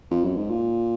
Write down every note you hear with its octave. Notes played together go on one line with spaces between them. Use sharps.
F2
F#2
G#2
A#2